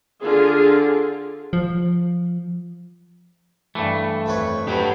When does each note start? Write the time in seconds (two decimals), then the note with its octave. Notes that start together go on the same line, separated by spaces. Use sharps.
0.23 D3 F4 G#4
1.53 F3
3.75 G2 E3 A3
4.26 F2 B4 C#5
4.68 F#3 G4 B4